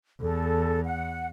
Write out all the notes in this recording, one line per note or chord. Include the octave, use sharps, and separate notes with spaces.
E2 A4
F#5